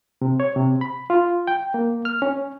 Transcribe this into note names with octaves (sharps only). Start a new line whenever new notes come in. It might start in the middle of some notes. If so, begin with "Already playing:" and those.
C3
C#5
C3
B5
F4
G5
A#3
F6
C#4